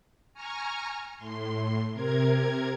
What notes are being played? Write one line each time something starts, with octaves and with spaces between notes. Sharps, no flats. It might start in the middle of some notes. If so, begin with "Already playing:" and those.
G#5 A#5 C#6 F6
A2 C6
C3 A#4 G#6